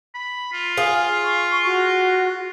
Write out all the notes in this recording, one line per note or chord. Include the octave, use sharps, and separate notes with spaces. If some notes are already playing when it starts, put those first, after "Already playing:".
B5
F4
G#4 F5
C#6
F#4